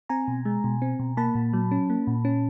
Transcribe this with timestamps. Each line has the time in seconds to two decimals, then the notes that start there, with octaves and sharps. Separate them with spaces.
0.09 C4 G#5 A#5
0.28 B2
0.45 G#3
0.64 B2
0.82 C4
1.00 B2
1.17 A#3 A5 B5
1.35 A#2
1.53 F#3
1.71 C#4
1.90 A#3
2.07 A#2
2.25 C#4